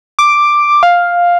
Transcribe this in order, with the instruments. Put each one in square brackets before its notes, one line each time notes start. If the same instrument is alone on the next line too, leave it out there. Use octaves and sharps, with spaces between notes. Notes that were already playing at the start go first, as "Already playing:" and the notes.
[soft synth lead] D6
F5